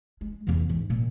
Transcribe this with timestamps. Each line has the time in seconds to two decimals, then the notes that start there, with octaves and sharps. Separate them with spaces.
0.21 G#3
0.47 E2 E3
0.69 G#2
0.90 A#2